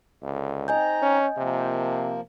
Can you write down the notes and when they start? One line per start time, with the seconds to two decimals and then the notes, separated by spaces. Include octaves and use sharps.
0.22 C#2 D3
0.68 C4 D#4 D#5 G#5 A#5 G6
1.02 C#4
1.37 C3 F3 A#3